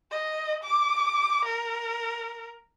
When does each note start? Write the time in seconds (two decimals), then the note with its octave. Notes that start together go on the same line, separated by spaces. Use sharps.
0.11 D#5
0.63 D6
1.45 A#4